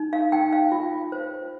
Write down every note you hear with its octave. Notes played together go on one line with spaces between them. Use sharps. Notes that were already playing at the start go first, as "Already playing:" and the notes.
Already playing: D#4
F5
D#4 G5
F5
F4
C5